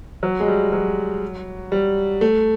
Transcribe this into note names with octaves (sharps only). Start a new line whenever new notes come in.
F#3
G#3
G3
F#3
G3
A3